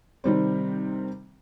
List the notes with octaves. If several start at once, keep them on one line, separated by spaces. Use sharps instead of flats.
C3 D#3 G3 C4